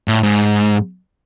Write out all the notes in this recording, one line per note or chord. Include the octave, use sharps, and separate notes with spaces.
A2
G#2